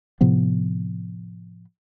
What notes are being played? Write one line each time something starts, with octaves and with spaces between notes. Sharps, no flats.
A2 C3 F3 B3